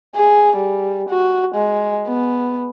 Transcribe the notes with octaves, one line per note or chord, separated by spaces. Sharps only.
G#4
G3
F#4
G#3
B3